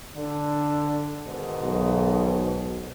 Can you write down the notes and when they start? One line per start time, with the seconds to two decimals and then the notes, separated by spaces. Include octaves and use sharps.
0.15 D3
1.26 G#2 B2 D#3
1.62 B1